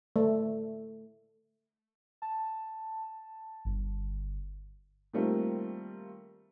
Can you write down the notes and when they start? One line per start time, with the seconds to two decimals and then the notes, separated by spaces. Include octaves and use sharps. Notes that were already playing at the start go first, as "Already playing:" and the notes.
0.16 A3
2.22 A5
3.65 G1
5.13 D#3 G3 A3 A#3 C4 F4